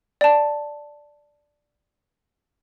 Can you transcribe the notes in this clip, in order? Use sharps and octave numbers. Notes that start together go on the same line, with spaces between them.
D5 A5